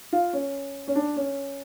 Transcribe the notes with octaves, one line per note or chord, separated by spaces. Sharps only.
F4
C#4
C#4
D4
C#4